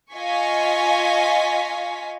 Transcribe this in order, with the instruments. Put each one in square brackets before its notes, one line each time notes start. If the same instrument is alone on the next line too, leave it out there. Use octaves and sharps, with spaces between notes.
[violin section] F4 D#5 F5 G#5 C#6 B6